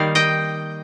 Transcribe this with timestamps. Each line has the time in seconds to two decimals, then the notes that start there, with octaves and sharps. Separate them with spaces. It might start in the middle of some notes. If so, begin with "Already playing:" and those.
Already playing: D#3 G3 A#3 F5
0.15 D#5 G5